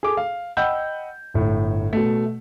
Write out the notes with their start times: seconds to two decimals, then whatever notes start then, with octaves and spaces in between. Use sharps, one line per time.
0.03 G#4 A4 D6
0.17 F5
0.57 D#5 F#5 G5 B5 E6 G6
1.34 G1 A2
1.93 B2 A3